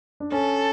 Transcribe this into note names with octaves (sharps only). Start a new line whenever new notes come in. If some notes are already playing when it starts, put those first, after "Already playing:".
D4
C#4 A4